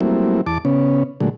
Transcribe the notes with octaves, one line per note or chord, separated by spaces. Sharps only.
F#3 G3 A3 A#3 C4 E4
E2 A5 D6
C#3 B3 C#4
A#2 D3 F#3 G#3 A3